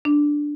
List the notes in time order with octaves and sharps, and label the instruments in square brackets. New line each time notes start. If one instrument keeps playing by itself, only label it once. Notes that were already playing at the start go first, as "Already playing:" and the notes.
[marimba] D4